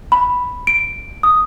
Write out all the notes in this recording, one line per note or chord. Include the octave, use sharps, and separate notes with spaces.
B5
D7
D#6